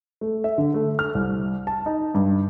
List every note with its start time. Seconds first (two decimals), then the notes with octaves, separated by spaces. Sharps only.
0.21 A3
0.44 E5
0.58 D3
0.74 A3
0.99 F6
1.15 C2
1.67 A5
1.86 D#4
2.14 G2